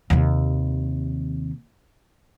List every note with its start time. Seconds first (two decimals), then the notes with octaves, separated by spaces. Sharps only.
0.10 D#2 C3